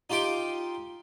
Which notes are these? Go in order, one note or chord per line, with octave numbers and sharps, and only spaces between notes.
D#4 F4 G4 C6 D6